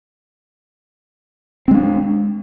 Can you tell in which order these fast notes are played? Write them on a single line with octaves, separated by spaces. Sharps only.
C4 G#3 D4